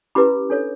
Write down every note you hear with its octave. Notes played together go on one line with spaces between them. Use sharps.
C#4 E4 G4 B4 B5 D6
D4 A4 C#5